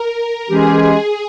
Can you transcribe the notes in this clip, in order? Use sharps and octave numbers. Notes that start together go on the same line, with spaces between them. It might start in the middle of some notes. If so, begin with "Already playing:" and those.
Already playing: A#4
E3 G#3 C#4 G4 G#4